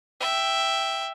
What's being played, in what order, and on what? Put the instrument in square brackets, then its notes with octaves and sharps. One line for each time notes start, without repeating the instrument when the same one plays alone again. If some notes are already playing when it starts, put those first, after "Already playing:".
[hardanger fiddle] E5 G5